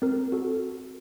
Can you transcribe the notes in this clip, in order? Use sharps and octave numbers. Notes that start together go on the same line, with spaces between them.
C4 A#4
F#4 A4